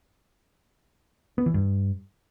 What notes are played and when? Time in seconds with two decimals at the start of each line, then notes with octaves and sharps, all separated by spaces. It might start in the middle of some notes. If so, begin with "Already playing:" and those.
1.38 B3
1.46 E3
1.54 G2